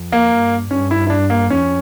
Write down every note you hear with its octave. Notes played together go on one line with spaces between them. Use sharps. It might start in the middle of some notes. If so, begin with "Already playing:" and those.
Already playing: F2
A#3
G2
G2 C#4
E4
E4
D4
A#3
F2 C#4